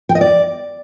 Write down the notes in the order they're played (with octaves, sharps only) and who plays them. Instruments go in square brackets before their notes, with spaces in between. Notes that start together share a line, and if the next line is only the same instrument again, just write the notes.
[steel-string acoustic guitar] G5
D#5
D5